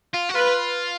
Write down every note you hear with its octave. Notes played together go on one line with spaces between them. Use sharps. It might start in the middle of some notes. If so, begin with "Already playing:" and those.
F4
F#4
F4 B4